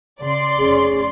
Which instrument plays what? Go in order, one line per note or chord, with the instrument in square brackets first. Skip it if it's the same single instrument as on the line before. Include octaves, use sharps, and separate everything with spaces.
[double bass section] C#3 [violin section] D5 C6
[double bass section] F1 C#4 [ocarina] G#4